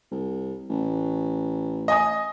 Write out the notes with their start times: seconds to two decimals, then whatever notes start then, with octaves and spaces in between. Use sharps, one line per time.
0.11 C2
0.70 A1
1.88 D#5 G#5 D#6